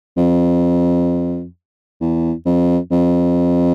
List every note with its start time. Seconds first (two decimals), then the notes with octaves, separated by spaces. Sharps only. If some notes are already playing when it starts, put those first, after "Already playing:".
0.17 F2
2.01 E2
2.46 F2
2.91 F2